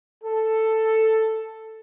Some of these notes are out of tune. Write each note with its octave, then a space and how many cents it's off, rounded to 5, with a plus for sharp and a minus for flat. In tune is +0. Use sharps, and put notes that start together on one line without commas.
A4 +5